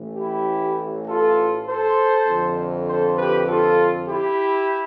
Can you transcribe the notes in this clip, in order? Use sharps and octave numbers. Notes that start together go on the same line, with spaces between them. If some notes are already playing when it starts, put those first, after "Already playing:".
Already playing: A1 A2 E3
E4 G4
F4 A4
A4 C5
F2 D3
A4 C5
G4 B4
F4 A4
E4 G4